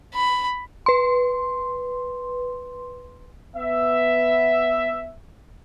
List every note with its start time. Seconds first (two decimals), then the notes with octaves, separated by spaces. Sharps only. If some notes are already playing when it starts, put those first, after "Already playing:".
0.14 B5
0.86 B4 C6
3.56 B3 E5